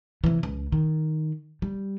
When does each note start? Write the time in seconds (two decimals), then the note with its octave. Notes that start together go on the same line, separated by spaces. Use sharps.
0.24 C3 E3
0.43 C#2
0.72 D#3
1.62 G3